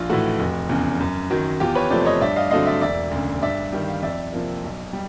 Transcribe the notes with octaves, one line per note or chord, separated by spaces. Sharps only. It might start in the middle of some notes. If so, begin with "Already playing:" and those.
Already playing: A#1 F4
A2 E3 A3 F#4
F1
E2 C#3
F#2
D#3 F#3
E2 F4 G4
B4 C#5
C3 F3 A3 C5 D5
C#5 D#5
G2 D5 E5
D#5 F5
D3 F#3 A3 C4 D#5 F5
D5 E5
E1 D5 E5
D2 C#3
G2 D5 E5
D#3 G3
F5
F2 D5 E5
C3 F3 A#3
B1
G3